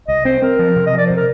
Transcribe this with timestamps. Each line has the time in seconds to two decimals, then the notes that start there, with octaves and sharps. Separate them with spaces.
0.08 C2 D#5
0.25 C4 C5
0.42 C4 A#4
0.59 F3
0.76 C3
0.87 D#5
0.93 F3 D5
1.06 C3 C5
1.17 A#4